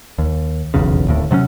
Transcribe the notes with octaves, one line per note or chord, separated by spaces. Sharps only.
D#2
F1 B1 E2 C#3
D1 D#2 A2
C3 F#3 B3 C#4